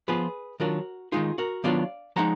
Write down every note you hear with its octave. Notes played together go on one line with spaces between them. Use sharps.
F3 B3 F4 G#4 B4
D#3 F#3 D4 F4 F#4 A#4
D#3 G#3 D#4 F4 G#4
F#4 A#4
D#3 F#3 B3 D4 F4 D5 F5
F3 G#3 D#4 F#5 A#5